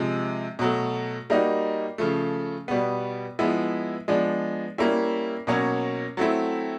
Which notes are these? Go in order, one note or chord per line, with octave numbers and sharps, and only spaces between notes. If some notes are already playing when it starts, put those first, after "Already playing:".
Already playing: C3 F3 G#3
B2 F#3 A3
G3 A#3 D#4 F#4
C#3 F3 A3
B2 G3 B3
F3 G#3 B3 E4
F3 G#3 B3 D4
G3 A#3 C#4 E4
B2 F#3 A#3 C#4
F#3 A3 C4 E4